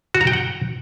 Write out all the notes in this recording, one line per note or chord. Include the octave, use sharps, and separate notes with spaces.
F#4
A#5
G5
F#5